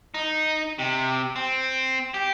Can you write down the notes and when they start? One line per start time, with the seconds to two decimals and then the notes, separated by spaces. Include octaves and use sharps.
0.14 D#4
0.79 C3
1.36 C4
2.14 G4